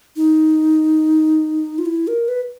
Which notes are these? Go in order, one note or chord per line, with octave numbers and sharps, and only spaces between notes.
D#4
F4
E4
A#4
B4